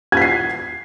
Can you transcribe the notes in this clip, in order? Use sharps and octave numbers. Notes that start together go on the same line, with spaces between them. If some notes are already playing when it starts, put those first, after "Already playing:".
G#6 B6 C7